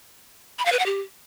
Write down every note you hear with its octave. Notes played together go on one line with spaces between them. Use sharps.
B5
F5
B4
F#5
G4